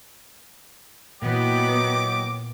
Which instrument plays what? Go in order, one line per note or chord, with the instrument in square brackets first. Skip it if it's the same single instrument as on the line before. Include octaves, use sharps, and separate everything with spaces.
[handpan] A#2 E3 [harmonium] F#3 D#5 G5 [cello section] B3 [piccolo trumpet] D6